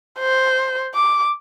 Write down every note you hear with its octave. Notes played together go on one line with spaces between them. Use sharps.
C5
D6